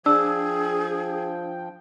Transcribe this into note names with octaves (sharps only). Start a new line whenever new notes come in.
F3 D4 G#4 G5 E6